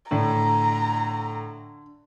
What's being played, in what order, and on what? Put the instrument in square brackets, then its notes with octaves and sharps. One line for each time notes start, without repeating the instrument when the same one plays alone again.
[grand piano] A2 [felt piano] D3 [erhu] A#5